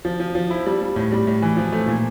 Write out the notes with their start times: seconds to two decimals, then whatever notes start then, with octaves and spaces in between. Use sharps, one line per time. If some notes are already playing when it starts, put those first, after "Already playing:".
0.05 F3
0.20 F3
0.35 F3
0.50 E4
0.66 G3
0.82 G3
0.96 A2
1.12 G3
1.27 A2
1.42 E3
1.57 F3
1.72 A3
1.88 A#2